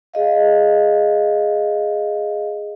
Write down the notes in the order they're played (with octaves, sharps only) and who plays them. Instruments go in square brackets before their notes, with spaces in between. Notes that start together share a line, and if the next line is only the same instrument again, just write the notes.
[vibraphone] G#4 D#5 F5